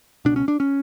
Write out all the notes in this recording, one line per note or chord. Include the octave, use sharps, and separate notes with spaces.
C#2 B2 D4
C#4
D4
C#4